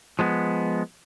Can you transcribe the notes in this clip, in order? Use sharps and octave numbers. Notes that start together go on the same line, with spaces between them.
F3 G#3 B3